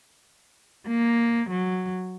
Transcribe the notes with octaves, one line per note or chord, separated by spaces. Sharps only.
A#3
F#3